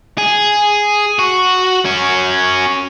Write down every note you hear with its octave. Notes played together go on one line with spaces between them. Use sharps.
G#4
F#4
C#4 F#4